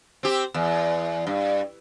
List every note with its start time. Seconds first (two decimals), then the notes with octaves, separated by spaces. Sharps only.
0.23 C4 G4
0.54 E2
1.27 G2